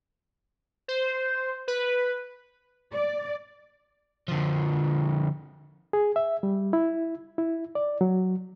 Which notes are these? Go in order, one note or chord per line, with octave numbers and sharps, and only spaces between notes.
C5
B4
D5
D3 F3
G#4
E5
G3
E4
E4
D5
F#3